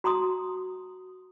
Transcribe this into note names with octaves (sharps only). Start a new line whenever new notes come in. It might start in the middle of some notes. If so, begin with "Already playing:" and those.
F#4 A#5 C6 D#6